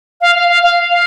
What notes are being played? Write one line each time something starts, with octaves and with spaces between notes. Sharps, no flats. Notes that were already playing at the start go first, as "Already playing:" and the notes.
F5
F5
F5
F5
F5